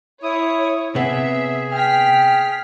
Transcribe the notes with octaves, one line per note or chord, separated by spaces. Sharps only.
E4 C#5 D#6
C3 B3 G#4 E5
G5 F6 B6